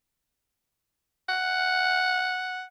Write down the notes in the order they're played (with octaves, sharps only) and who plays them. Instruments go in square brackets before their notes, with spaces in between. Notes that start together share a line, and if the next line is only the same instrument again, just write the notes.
[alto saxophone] F#5